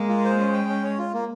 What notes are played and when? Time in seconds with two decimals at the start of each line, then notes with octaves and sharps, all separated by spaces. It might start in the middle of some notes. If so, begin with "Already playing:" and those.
Already playing: G#3 A#3
0.09 F4
0.25 C5
0.39 C#4
0.53 G5
0.69 C#4
0.84 C#5
0.99 F4
1.13 A#3